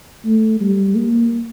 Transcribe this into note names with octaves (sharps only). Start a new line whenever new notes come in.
A3
G3
A#3